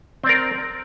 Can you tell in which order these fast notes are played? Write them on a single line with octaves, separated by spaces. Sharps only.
C4 D5 A#4